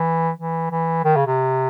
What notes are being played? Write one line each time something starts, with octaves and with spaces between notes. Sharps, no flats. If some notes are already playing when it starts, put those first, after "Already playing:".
Already playing: E3
E3
E3
D#3
C#3
C3